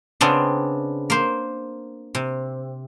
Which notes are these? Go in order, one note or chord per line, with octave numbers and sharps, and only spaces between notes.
C#3 B3 C4 D4
A#3 C5
C3